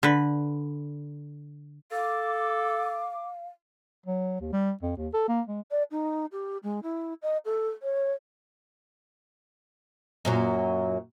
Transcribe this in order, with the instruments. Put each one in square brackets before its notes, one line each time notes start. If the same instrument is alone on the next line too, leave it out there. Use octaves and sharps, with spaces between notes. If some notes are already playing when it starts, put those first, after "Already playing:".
[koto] D3 B4
[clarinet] A4 [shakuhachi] F5 [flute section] D6
[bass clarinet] F#3
D#2
G3
F2
D#2
A4
A#3
G#3
[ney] D5
D#4
G4
G#3
E4
D#5
A4
C#5
[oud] F#2 A#2 F#3